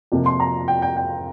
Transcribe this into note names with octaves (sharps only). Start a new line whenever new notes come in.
F2 C3 F3 A#3
C6
A#5
G5
G5
G5